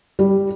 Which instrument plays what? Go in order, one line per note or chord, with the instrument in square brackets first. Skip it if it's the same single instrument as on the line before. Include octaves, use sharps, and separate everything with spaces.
[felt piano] G3